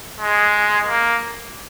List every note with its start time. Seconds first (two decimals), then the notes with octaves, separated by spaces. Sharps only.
0.20 G#3
0.87 A#3